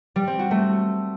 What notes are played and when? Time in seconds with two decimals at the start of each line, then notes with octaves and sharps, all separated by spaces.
0.16 G3
0.27 C4
0.39 F#4
0.51 A3